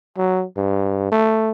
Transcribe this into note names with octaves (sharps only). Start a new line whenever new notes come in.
F#3
G2
A3